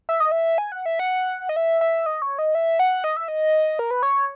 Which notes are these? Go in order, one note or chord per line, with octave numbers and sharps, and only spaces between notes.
E5
D#5
E5
G#5
F#5
E5
F#5
D#5
E5
E5
D#5
C#5
D#5
E5
F#5
D#5
E5
D#5
A#4
B4
C#5